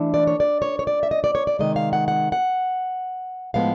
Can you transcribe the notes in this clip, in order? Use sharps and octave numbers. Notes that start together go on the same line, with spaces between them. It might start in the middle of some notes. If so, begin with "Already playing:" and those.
Already playing: E3 A3 D4
D5
C#5
D5
C#5
C#5
D5
E5
D#5
D5
C#5
D5
C3 D#3 G#3 D#5
F5
F#5
F#5
F#5
A2 F3 G#3 B3 F5